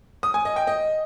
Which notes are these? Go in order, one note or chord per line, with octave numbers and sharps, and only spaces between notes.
D#6
G#5
D#5
G5
D#5